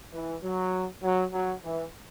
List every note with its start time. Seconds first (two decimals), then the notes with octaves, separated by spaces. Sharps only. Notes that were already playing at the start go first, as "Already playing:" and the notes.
0.13 E3
0.43 F#3
1.03 F#3
1.32 F#3
1.63 E3